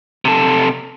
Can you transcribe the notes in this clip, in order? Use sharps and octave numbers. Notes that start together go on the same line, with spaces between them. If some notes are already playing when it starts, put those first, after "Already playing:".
C3 A4